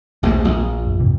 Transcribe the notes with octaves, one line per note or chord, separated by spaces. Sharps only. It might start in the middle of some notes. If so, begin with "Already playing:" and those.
A#1 D#2 G#2 A3
A#1
F#2
F2 G#2 C3